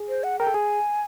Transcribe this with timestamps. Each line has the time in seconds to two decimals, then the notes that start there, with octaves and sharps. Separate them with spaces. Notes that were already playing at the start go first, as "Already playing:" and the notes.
Already playing: G#4
0.09 C5
0.24 F#5
0.39 A#4 G5
0.47 A4
0.54 G#4 G#5